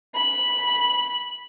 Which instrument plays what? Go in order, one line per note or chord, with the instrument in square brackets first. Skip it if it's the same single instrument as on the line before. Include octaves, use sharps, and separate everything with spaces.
[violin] B5